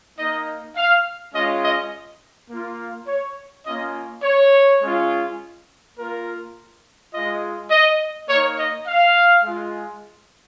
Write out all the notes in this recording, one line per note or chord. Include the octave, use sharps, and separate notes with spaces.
A#3 D#4 D#5
F5
G#3 C#4 F4 D#5
D#5
A#3 F4
C#5
A#3 C#4 F4 D#5
C#5
G#3 C#4 F4
A#3 F4 A#4
G#3 F4 D#5
D#5
A#3 D#4 C#5
D#5
F5
G#3 F4